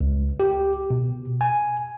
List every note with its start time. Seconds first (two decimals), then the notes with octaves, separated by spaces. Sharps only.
0.01 C#2
0.40 G4
0.90 B2
1.41 G#5